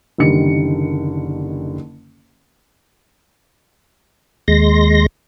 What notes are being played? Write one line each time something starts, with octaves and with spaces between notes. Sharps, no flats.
F#1 D3 D#3 G3 C#7
D#2 G#3 C6 A#6